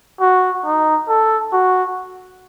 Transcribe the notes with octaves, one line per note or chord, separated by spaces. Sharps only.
F#4
D#4
A4
F#4